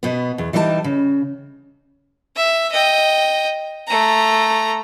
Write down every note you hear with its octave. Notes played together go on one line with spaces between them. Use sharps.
B2 B3
E2
E3 G3 D#4 C5 A5
C#3
E5
D#5 G5
A3 A#5